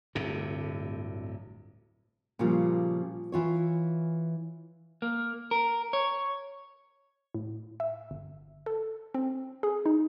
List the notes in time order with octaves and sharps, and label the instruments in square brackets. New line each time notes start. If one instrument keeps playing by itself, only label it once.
[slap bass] D1 G1 A2 C3
[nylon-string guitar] A#2 C#3 F3 G3 F4
E3 F4 C#5
[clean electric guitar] A#3
A#4
C#5
[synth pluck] A2
E5
G1
A4
C4
G#4
D#4